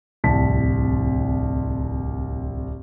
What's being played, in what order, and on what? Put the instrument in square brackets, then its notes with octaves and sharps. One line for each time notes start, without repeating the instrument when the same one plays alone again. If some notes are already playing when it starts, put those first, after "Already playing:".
[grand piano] D1 C2 F2 A5 B6